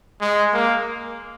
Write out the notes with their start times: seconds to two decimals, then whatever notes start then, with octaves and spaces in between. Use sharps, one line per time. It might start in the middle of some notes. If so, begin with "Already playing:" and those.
0.21 G#3
0.53 A#3